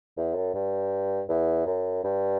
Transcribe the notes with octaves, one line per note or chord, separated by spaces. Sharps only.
E2
F#2
G2
E2
F#2
G2